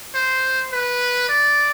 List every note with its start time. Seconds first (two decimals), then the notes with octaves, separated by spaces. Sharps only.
0.14 C5
0.72 B4
1.29 D5